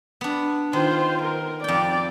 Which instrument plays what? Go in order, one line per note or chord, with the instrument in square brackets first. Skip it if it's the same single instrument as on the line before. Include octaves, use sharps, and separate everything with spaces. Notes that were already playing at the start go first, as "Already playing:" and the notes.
[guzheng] B3 D4
[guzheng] D#3 [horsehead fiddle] F4 C5
[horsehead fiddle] A#4
[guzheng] F2 G5 [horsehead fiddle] D5